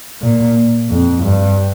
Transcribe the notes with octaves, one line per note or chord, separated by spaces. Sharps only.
A#2
F2
G2